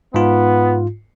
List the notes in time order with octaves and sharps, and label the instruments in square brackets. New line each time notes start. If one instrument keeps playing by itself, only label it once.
[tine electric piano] G#2 F4 [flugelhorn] B3